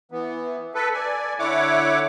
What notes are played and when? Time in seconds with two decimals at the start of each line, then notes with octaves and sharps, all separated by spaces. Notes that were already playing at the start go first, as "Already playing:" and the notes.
0.12 E3 B3
0.75 A4 B4
0.93 D5 G#5
1.39 D3 E4 C#5 F#5 D6